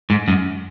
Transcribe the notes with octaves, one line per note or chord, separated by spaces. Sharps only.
G#2
F#2